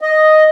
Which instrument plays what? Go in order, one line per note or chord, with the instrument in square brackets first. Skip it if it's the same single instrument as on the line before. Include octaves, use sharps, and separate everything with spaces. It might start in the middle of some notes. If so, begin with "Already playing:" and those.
[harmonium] D#5